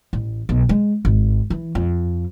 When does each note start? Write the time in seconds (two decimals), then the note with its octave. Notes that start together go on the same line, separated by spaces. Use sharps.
0.13 A1
0.49 B1
0.69 G#3
1.05 G#1
1.50 E3
1.75 F2